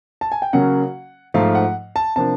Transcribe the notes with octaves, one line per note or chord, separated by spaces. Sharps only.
A5
G#5
G5
C#3 F#3 A#3 C#4 F#5
G#2 F3 A3 F5
F#5
A5
C3 F3 A#3 D4 A5